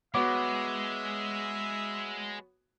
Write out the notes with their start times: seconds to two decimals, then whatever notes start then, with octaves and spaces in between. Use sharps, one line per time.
0.14 G#3 B3 F#4 C#5 E5 D6